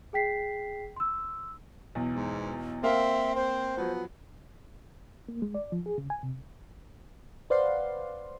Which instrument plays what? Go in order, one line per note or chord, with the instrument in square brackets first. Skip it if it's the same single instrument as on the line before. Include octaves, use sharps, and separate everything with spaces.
[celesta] G#4 G5 B6 C7
C6 E6
[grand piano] B1 E2
[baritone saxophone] G#2
[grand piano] A#3 A#4 F5 [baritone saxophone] C4 [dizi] E5
[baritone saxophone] C4 [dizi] C5
[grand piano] F3 F#3 [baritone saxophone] B3
[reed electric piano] A#3
G#3
D5
F3
G#4
C#3
G#5
C3
[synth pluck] B4 C5 D5 F5 F#5 C6